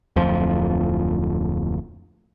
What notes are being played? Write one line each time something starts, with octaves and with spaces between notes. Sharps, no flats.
D1 F2 F3